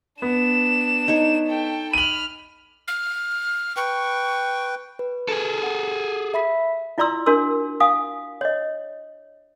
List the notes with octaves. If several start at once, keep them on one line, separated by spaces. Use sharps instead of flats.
B3 D4 E7
D#4 C#5
A4 G5
B5 F6 D#7 F#7
F6
B4 G5 C#6
B4
G#4 A4
F#5
E5 B5 B6
E4 F4 D5 A#5 C6 E6
D4 F#4 A#4 C6 E6
F5 G#5 D#6
C#5 D#5